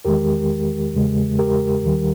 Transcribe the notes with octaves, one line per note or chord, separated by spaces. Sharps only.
E2 D#3 G#3 G4 A#4
E2 C#3 G#3
G4 A#4
D#2 D#3 G3